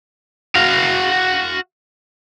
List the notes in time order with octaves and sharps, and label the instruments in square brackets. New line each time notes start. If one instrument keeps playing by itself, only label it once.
[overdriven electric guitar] F#4 F5